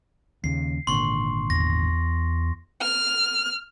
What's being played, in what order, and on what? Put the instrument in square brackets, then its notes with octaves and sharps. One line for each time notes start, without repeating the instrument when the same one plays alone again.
[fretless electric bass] D#2 C#3 [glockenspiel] C7
[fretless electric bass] G#1 A#2 D3 [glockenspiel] C6 C#6
[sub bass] E2 [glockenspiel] A#6
[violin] F6